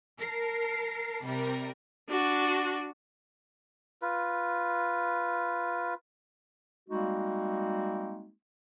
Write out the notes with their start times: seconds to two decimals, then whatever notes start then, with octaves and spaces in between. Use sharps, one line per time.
0.20 A#4 A5 C7
1.25 C3 G3 A#4
2.09 D4 F#4
4.02 F4 B4
6.89 G3 G#3 A#3 C4 D#4 F#4